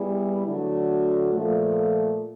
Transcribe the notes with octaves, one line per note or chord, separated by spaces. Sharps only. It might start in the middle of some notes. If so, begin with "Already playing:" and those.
Already playing: G3 B3 E4 G#4
D3 F#3 A3 D4 F#4
A#2 F3 A3